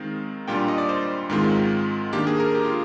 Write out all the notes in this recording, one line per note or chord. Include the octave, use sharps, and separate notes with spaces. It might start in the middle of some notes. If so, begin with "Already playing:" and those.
Already playing: D#3 G#3 C4 D#4 F5
A#2 G3 D4 F4 G5
D#5
D5
C5
G#2 D#3 G#3 C4 F4
D#3 A#3 D4 G4
G#4
A#4
G4
F4